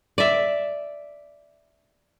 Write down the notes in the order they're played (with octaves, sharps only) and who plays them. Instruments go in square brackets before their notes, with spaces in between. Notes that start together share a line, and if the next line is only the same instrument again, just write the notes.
[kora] D5 E5